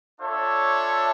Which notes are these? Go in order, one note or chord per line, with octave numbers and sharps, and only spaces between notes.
D4 F4 A4 C#5 E5